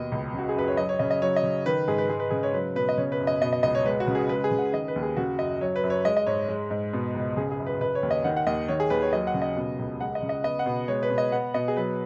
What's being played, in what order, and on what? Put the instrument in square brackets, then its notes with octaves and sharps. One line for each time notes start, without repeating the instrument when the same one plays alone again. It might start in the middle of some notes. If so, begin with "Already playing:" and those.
Already playing: [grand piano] D#2 B2 D#5
C#2
C#3 F#4
G#4
F#2 B4
C#5
F#3 D#5
C#5
C#3 D#5
D#5
F#3 C#5
D#5
C#3
D#3 B4
G#2 G#4
B4
G#3 G#4
B4
C#3 G#4
C#5
F#3 B4
B2 B4
D#5
C#3 C#5
B4
F#2
D#5
B2 D#5
D#5
C#2 D#5
C#5
G#3 B4
F#4
C#3
G#4
G#3 B4
G#4
C#3
F#5
D#3 D#5
B4
D#2
G#4
C#3 F#4
F#2 D#5
F#3 C#5
B4
F#2
C#5
G#3 D#5
D#5
G#2 C#5
G#3
G#2
B2
C#2
C#3 G#4
G#4
F#2
B4
C#3 B4
C#5
D#2
D#5
D#3 F#5
F#5
D#2 D#5
D#3 C#5
G#4
D#2 B4
C#5
F#3 D#5
F#5
C#3
D#5
B2
C#2
G#3 F#5
D#5
C#3
D#5
B3 D#5
F#5
B2
G#3 C#5
B4
B2
D#5
B3 F#5
B2 D#5
G#4
F#3 B4